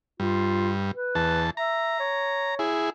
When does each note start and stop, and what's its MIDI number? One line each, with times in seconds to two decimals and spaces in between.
0.20 0.91 43
0.20 0.71 65
0.94 1.42 71
1.15 1.50 40
1.15 1.50 81
1.57 1.98 76
1.57 2.55 82
1.99 2.67 73
2.59 2.90 64
2.59 2.90 68